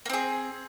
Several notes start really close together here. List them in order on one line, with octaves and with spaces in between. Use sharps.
A#3 C4 G#4